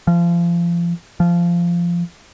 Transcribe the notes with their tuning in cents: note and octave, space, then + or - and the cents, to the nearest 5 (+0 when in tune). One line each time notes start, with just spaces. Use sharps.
F3 -30
F3 -15